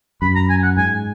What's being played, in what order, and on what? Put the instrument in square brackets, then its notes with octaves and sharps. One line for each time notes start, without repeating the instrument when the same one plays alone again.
[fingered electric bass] F#2 [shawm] B5
[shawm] A#5
G#5
F#5
[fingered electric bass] G#2 [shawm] G#5